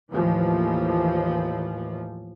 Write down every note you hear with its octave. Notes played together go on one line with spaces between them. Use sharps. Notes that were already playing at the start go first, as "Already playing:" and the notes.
D#2 A2 E3 F3